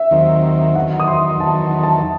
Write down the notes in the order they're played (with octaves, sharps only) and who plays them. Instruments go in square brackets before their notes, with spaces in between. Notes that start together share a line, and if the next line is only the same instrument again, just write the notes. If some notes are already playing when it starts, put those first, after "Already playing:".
Already playing: [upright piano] E5
[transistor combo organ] D#2 D#3 F#3 C4
[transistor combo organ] E2 D#3 F#3 [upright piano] F#5
[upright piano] D#6
C6
[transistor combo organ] E2 D#3 F#3 [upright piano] A5
[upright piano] A5